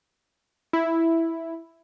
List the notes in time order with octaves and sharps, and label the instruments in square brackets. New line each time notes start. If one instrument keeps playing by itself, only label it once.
[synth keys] E4